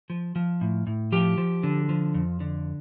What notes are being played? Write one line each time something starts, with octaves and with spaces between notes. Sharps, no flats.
F3
F3
A2
A2
F3 G4
F3
D3
F3
F2
D3